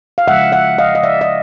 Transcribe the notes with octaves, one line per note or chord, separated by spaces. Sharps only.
F5
C#3 F3 G#3 E5 F#5
E5 F#5
D#5 F5
D#5
D5 E5
D#5